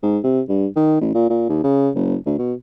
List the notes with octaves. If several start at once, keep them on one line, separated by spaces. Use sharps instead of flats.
G#2
C3
G2
D#3
A1
A#2
A#2
D#2
C#3
F#1
D2
B2